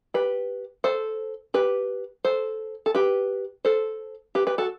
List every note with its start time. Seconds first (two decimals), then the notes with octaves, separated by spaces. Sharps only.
0.14 G4 B4
0.84 A4 C5
1.54 G4 B4
2.24 A4 C5
2.86 A4
2.95 G4 B4
3.65 A4 C5
4.35 G4 B4
4.47 G4 B4
4.58 F#4 A4